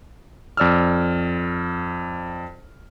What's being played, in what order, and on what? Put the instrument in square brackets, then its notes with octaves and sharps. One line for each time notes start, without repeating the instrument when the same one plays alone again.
[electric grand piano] F2 D5 E6 F6